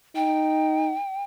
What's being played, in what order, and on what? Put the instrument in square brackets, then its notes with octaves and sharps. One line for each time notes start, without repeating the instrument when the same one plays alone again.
[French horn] D#4 [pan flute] G5